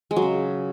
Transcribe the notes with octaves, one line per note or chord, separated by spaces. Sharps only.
G#3
F#3
C#3